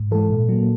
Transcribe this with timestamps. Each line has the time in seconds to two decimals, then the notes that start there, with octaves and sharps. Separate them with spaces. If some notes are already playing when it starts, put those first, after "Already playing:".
Already playing: G#2
0.11 E3 G#3 A4
0.30 A#2
0.49 F#3 A#3